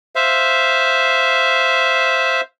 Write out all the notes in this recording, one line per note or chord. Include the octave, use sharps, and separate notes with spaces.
C5 E5 F5